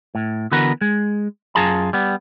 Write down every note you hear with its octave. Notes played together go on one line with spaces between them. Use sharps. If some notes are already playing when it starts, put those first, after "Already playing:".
A2
D3 E3 B3 F#4 A#4 B4
G#3
F#2 F4 G#4 A5 A#5
G3 B3